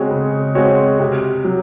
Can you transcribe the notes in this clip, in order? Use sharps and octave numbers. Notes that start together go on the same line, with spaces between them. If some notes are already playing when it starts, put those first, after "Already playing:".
Already playing: C#3 G#3 C4 F#4 C#5
C#3
G#3 C4 F#4 C#5
C3
F#3